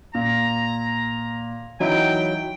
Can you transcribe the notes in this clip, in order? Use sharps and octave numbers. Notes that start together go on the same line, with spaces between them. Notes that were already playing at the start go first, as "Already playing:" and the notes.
A#2 A#5
E3 F#3 D#4 E4 G5